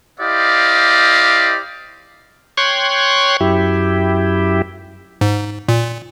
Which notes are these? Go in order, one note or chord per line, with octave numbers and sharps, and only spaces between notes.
E4 G4 C5 D5 D#5 F5
C#5 G5 C6 C#6 F#6 G#6
F#2 E4 G4
G#2
A#2